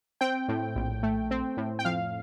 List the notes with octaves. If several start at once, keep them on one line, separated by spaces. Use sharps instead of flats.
C4 G5
A2
A#1
A3
C4
A2
G5
F2 F5